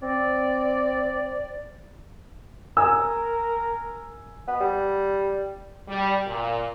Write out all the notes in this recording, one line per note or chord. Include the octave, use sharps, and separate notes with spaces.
C4 D5
A#4 G#5 E6
B3
G3
G3
A#2